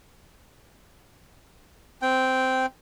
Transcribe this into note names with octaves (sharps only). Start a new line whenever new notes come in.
C4 G5